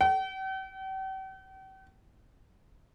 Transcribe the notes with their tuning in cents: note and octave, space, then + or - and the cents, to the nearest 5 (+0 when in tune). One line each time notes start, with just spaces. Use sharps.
G5 -45